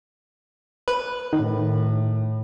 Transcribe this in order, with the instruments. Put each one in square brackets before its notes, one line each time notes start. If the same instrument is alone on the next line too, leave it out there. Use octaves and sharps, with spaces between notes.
[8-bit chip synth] B4
[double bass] A2 [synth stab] D#3